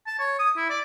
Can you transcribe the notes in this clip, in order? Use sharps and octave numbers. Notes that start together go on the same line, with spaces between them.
A5
C#5
D#6
E4
D5